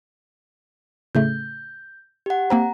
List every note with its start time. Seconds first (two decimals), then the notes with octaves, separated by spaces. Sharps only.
1.15 A2 C#3 A3 G6
2.26 G4 F#5
2.50 A#3 C4 C5 A#5